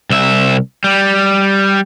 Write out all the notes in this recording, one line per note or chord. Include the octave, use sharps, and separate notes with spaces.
C2 E5
G3